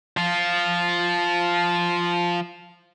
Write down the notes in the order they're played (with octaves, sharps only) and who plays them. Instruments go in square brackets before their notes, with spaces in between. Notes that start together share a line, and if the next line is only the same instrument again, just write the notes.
[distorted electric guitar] F3 F4